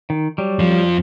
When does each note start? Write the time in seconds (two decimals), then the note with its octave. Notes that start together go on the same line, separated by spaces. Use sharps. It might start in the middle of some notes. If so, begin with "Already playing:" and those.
0.10 D#3
0.38 F#3 G3
0.59 F2 F3